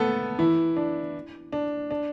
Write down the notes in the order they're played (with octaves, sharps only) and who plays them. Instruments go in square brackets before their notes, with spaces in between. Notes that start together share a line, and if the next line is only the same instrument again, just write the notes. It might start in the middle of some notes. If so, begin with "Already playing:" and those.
Already playing: [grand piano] A3 B3 A4 B4
E3 E4
D4
D4
D4